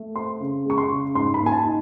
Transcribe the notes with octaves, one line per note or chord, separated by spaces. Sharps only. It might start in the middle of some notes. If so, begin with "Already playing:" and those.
Already playing: A3
C4 C6
C#3
G#3 C#6
C6
C#3
G#2 C6
B5
A#3
G#5
A5
D#4